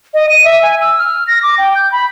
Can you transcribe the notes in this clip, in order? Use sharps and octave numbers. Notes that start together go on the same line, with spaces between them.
D#5
D#7
E5
G#5
E6
F6
A#6
D6
G5
G6
B5